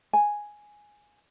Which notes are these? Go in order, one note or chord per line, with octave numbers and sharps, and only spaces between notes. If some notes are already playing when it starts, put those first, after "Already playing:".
G#5